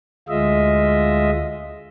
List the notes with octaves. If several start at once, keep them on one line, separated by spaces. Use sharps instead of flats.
D2 G#3 F4 D#5 E5